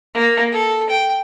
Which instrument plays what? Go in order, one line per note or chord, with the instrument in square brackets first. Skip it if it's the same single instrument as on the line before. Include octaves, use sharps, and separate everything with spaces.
[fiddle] A#3
A4
G5